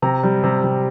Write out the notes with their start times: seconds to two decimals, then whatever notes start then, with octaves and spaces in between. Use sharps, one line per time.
0.02 C3 A#5
0.23 G3
0.44 C3
0.64 C3